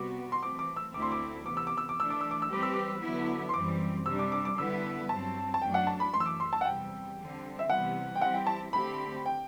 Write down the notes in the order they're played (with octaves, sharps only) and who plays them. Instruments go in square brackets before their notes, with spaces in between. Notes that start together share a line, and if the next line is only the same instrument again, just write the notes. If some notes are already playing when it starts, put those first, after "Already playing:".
Already playing: [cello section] C3 G3 B3 F#4 [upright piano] D6
[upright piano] C6
[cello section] E3 A3 C4 [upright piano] D6
[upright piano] D6
E6
[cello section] D2 D3 A3 C4 E4 [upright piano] D6
[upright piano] C6
D6
[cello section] C3 E3 B3 [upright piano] D6
[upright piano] E6
D6
E6
D6
[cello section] E3 A3 D4 [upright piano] E6
[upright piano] D6
E6
D6
E6
[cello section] E3 G3 C4 G4 B4 [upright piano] D6
[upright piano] E6
D6
[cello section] D3 F#3 B3 E4
[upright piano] C6
[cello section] F#2 E3 G3 C4 [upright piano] D6
[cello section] C3 G3 D4 [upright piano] E6
[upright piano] D6
D6
D6
[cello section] D3 G3 B3 E4 B4 [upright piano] E6
[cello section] G2 F#3 C4 [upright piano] A5
[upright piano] A5
[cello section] F#2 F#3 A3 D4 [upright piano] G5
[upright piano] F#5
A5
B5
[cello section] F#2 E3 A3 [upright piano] C6
[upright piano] E6
D6
C6
A5
F#5
[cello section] E2 C3 G3 [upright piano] G5
[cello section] D3 G3 C4
[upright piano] E5
[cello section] C3 E3 G3 B3 E4 [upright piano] F#5
[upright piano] G5
[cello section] E3 G3 C4 E4 G4 [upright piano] F#5
[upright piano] G5
A5
[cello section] D3 A3 C4 G4 [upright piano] B5
[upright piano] G5